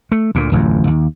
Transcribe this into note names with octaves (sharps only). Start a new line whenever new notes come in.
A3
D2 A#2
D1 A1 F2
D#2